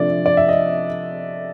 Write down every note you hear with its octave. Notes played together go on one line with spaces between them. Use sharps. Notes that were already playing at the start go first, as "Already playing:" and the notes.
Already playing: C3 F3 A3 D4 D5
D5
E5
D#5